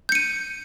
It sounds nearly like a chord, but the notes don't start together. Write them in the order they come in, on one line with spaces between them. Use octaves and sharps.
G6 C#7 D#7